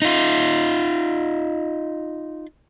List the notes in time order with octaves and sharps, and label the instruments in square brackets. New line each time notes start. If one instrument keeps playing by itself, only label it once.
[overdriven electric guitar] D#4 F4